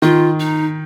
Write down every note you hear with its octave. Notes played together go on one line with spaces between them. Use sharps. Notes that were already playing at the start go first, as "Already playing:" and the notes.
D#3 F4
D#4